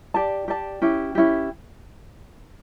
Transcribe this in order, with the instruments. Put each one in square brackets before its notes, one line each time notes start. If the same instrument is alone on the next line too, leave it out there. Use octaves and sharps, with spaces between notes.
[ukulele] G4 D5 A5
G4 D5 A5
C#4 E4 G4
C#4 E4 G4